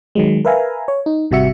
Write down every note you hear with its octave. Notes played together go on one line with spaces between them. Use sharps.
D#3 F#3 G#3
A#4 B4 E5 F5 G#5 A#5
C#5
D#4
G#1 C3 G3 F#4 E5 C#7